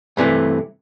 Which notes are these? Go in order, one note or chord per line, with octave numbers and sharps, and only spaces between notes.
G2 C3 E3 A3